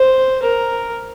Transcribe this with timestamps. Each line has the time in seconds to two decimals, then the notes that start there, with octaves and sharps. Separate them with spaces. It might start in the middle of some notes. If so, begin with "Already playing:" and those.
Already playing: C5
0.43 A#4